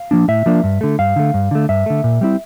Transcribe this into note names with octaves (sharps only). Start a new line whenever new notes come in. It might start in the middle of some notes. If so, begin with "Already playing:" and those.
Already playing: F5
F3 A#3 D4
A2 E5
F3 A#3 D4
G2
D3 A3
G2 F5
D3 A3
G2
D3 A3
G2 E5
D3 A3
A#2
G3 C4 E4